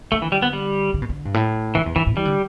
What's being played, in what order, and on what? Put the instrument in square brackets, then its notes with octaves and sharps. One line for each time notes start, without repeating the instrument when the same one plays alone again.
[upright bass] D3 [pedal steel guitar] A3
[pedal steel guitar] E3
G3
B3
G3
[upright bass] D3
B2
D3
G2
A2
[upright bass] G2 [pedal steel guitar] E3
[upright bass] E2
[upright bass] G2 [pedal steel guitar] E3
[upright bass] A2
[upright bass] E3 [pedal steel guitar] G3
[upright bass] D3